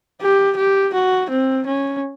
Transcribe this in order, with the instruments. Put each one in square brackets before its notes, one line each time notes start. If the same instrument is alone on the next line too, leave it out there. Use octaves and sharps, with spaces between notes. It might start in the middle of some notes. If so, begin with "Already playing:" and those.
[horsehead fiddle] G4
G4
F#4
C4
C#4